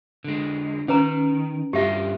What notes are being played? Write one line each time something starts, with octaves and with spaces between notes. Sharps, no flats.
D3 G#3
D#3 C#4 B4 A#5
G2 A#3 F4 G4 E5